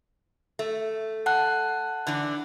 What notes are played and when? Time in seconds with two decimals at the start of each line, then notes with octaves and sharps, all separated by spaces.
0.59 A3
1.26 F#5 A5 F#6
2.07 D3 E3 D4